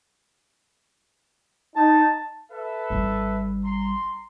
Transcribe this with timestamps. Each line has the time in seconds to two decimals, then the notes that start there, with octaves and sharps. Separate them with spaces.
1.76 D#4 A5
2.51 A4 B4 E5
2.90 G#1 G3
3.64 A#5 C6